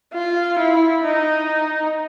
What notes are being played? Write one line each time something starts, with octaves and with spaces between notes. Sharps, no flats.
F4
E4
D#4